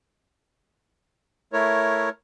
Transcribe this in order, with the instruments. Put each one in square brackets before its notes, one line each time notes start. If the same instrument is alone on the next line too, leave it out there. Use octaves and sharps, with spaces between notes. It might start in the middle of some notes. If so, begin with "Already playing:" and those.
[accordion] A3 E4 A#4 C#5